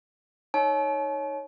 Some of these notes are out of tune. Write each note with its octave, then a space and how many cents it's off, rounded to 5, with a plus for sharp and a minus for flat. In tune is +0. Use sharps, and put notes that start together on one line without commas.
D#4 +0 C#5 -5 A5 -45